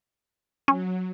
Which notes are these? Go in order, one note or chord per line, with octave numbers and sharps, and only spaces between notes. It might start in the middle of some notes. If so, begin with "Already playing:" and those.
F#3 C#4